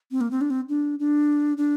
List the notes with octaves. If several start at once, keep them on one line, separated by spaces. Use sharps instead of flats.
C4
A#3
C4
D4
C4
D4
D4
D4